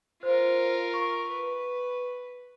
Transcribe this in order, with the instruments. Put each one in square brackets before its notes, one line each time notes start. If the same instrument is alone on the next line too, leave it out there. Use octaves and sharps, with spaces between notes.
[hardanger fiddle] F4 A#4 [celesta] C5
[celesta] C#6
[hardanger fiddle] B4